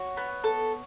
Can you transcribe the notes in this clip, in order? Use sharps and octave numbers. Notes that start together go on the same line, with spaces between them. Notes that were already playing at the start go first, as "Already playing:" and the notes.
Already playing: F#4 C#5
B3
A4